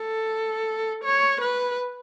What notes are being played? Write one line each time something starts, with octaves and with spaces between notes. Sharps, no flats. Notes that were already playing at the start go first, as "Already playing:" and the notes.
Already playing: A4
C#5
B4